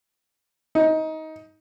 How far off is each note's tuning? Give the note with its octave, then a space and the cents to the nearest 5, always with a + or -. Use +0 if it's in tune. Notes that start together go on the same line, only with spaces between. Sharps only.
D#4 +20